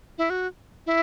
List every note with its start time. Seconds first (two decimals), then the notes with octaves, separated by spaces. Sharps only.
0.18 E4
0.30 F#4
0.86 E4